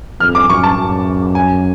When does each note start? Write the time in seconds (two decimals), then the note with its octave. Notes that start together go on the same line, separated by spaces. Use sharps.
0.20 F2 F6
0.35 D6
0.49 F#2 C#6
0.64 A5
0.77 F#2
1.35 G#5